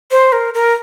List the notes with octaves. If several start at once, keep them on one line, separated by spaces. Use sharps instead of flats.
C5
A#4
A#4